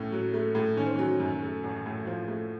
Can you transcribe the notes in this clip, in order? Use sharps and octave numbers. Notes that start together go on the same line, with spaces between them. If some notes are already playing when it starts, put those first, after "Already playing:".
Already playing: A2 C#4
F#3
A3
A2
D#3 C#4
C4
F#3 C#4
F#2
A3
A1
A2
F3
A3